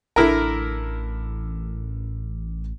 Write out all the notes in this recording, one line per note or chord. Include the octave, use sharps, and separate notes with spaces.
A1 D3 E4 A#4